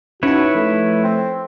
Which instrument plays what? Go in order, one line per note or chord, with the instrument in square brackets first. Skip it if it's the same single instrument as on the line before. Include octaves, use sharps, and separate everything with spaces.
[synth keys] C#4 D#4 A5 [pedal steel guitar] E4 B4 C#5 [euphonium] F#4
[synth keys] F3 [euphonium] A3
[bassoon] C4